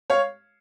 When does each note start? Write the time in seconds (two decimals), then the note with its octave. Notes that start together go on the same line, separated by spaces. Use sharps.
0.10 C#5 F5